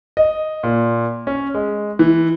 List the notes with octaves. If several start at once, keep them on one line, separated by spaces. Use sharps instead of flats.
D#5
A#2
C#4
G#3
E3